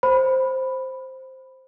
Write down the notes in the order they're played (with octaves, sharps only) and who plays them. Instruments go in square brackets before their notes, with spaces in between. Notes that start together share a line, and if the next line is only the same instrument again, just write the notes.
[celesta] C5 B5